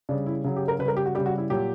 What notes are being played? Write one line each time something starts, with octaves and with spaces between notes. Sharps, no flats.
C#3 G3 D4
E4
C#3 F#3
G4
A#4
C#3 G3 B4
A#4
G4
F#4
C#3 G3 G4
F#4
E4
A#2 F#3 G4